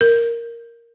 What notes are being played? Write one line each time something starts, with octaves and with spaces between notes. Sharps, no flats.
A#4